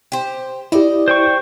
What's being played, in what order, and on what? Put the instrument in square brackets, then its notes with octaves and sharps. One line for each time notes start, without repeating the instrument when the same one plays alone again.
[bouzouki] G4 C5
[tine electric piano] E4 G4 [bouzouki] D5 D#5
[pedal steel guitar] C5 G5 C#6